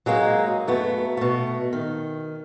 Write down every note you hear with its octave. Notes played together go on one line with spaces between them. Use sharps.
F#3 G#3 A#3 C4 D#4
F#2 A3 B3
B2 A3
D#3